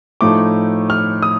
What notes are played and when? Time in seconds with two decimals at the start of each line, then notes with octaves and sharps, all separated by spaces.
0.21 A2 F3 A3 D#4 D6
0.90 F6
1.22 D#6